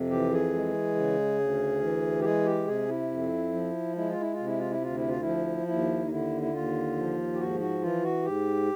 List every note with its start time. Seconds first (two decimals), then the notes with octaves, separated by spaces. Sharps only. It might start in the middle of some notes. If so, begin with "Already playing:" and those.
Already playing: F2 C3
0.11 E3 G4
0.32 G#4
0.53 G#3
0.96 C#3
1.40 D2
1.82 E3
2.20 G4
2.24 G#3 G#4
2.46 G4
2.67 C3 G#4
2.89 E4
3.10 F2
3.53 F3
3.96 G#3 E4
4.09 F4
4.20 E4
4.34 F4
4.39 C3
4.46 E4
4.59 F4
4.71 E4
4.81 D2 F4
4.96 E4
5.09 F4
5.21 F3 E4
5.68 D#2 E4
6.05 D#4
6.10 D3 E4
6.42 E4
6.53 D#2 F4
6.97 F3
7.34 G4
7.39 G#2 F#4
7.60 F#4
7.81 E3 F4
8.03 F#4
8.25 G#2 G4